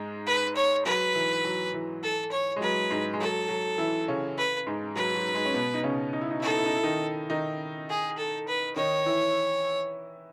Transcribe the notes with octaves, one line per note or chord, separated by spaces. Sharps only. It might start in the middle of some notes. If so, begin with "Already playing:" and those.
Already playing: G#2 G#3
B4
C#5
F#3 B4
E3
F#3
E3
A4
C#5
G#3
F#3 B4
G#2 G#3
G#3
F#3 A4
F#3
E3 E4
C#3 C#4
B4
G#2 G#3
F#3 B4
F#3
G#2 G#3
C#4
B2 B3
D#4
C#3 C#4
D#4
E4
D#4
E4 A4
D#4
E4
D#4
E4
D#3 D#4
D#3 D#4
G#4
A4
B4
D#3 D#4 C#5
E3 E4